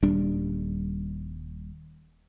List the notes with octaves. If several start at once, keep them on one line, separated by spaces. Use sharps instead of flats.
D#1 G3 D4